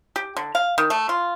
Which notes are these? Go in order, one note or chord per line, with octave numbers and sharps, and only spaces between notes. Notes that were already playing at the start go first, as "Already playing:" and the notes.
G4
D3
F5
D#3
A3
F4